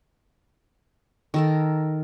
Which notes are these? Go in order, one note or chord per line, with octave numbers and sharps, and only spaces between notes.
D#3 A4 A#4